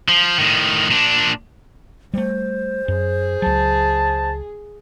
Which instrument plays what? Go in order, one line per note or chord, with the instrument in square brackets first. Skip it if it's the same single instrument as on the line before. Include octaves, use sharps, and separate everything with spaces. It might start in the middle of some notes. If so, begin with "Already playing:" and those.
[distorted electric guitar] F3
A2 D#3
A#2 D4
[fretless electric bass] G3 A3 [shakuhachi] C5
[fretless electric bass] F#2 [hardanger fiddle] G#4
[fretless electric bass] C#2 F#3 [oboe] A5